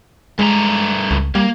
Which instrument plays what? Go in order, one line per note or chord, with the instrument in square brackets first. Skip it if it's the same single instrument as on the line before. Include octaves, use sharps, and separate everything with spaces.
[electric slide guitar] G2 A3 A#5 [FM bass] G#3
[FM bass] C#2
[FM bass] G3 [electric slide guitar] A#3